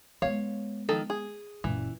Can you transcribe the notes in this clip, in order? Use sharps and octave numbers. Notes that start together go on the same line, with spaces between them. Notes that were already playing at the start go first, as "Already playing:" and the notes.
G#3 B3 C#5 F5
D#3 F3 A4
G#4
F#1 A#2 E3